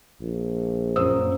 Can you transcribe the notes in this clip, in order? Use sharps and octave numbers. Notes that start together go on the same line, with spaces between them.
A#1
F#2 A#2 C#4 C5 D#6 E6